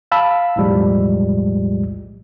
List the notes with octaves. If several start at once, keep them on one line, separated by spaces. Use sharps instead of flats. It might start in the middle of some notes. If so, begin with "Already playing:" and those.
F5 A5 B5 E6
B1 E2 A2 F3 G3 G#3